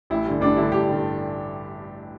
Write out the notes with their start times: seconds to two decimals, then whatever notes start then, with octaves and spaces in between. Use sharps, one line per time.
0.10 A1 E4
0.25 G2 D3
0.41 A1 D4
0.57 G2 D3 E4
0.72 A1 G4
0.88 G2 D3